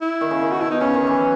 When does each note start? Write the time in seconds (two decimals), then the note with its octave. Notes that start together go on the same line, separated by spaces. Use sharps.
0.01 E4
0.21 D#3
0.31 C#3
0.41 D#3
0.52 F#4
0.61 B2 E4
0.71 D#4
0.80 C#3 C#4
0.94 D#3
1.07 E3
1.21 F#3